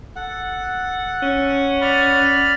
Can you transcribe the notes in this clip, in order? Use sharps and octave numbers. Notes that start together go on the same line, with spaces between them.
A4 F#5
C#4
D5 B5 F6